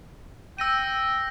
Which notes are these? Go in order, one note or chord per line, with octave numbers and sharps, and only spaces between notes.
G5 E6 A#6 D#7